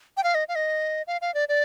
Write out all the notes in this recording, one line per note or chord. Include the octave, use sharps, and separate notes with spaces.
G5
F5
D#5
F5
D#5
F5
F5
D5
D5